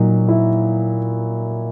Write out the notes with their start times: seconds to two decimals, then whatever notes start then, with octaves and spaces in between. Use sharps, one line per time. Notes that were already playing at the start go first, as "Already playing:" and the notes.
Already playing: A#2 F#3 D#4
0.28 E4